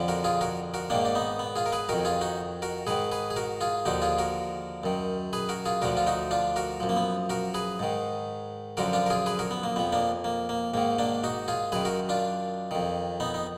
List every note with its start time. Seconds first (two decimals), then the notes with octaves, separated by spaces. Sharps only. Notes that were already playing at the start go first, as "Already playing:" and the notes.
Already playing: F2 D3 F3
0.08 F#4 A#4
0.24 F4 G#4
0.41 F#4 A#4
0.74 F#4 A#4
0.90 G#2 D#3 A#3 D4
1.05 D4
1.15 B3 D#4
1.39 B3
1.55 F4 G#4
1.66 A#4
1.72 G#4 B4
1.89 F2 D#3 F#4 A#4
2.05 F4 G#4
2.21 D#4 F#4
2.62 F#4 A#4
2.87 G#2 D#3 G#4 B4
3.11 G#4 B4
3.30 G#4
3.36 F#4 A#4
3.61 F4 G#4
3.85 D#2 D3 F3 D#4 F#4
4.02 F4 G#4
4.18 F#4 A#4
4.83 F#2 D#3
5.33 G#4 B4
5.49 F#4 A#4
5.66 F4 G#4
5.82 D2 D3 F3 F#4 A#4
5.97 F4
6.07 D#4 F#4
6.31 D4 F4
6.56 F#4 A#4
6.80 F#2 F3
6.89 A#3
6.96 B3
7.30 F#4 A#4
7.54 G#4 B4
7.79 G#2 D#3
8.77 F#2 D3 F3 F#4 A#4
8.93 D4 F4
9.06 A#4
9.10 F4 G#4
9.26 G#4 B4
9.39 F#4 A#4
9.51 B3
9.63 A#3
9.76 F2 F3 B3
9.92 A#3 D4
10.24 A#3
10.49 A#3
10.74 G#2 D#3 A#3
10.98 A#3 D4
11.24 D#4 F#4
11.48 F4 G#4
11.72 F#2 D#3 G#4 B4
11.85 F#4 A#4
12.09 D4 F4
12.71 F2 D#3
13.20 B3 D#4
13.34 D#4